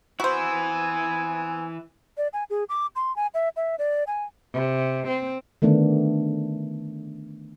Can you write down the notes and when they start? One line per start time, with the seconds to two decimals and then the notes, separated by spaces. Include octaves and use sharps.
0.20 E3 B3 C4 E4 F#4 C5 G#5
2.18 D5
2.33 G#5
2.50 G#4
2.69 D6
2.96 C6
3.16 G#5
3.34 E5
3.56 E5
3.79 D5
4.07 G#5
4.53 C3
5.07 C4
5.62 D3 D#3 A3 B3 D4